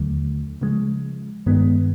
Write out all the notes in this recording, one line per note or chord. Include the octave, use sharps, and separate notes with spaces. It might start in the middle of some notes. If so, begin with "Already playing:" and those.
Already playing: D#2 D3 F#3 A3
C#3 F3 G#3
G2 D#3 G#3 B3